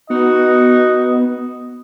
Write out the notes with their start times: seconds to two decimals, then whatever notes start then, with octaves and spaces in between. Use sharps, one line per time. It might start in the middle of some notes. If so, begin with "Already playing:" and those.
0.10 B3 D#4 F#4 D#5